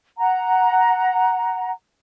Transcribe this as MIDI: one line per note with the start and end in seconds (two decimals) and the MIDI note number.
0.18 1.71 78
0.18 1.71 82